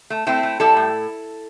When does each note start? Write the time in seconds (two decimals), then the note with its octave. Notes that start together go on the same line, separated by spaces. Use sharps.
0.10 A3
0.27 A3 C4 E4
0.43 A3
0.60 G3 E4 A4
0.77 A2